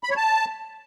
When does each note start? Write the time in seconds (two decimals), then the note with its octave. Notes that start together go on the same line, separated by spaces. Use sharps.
0.03 B5
0.10 C#5
0.17 A5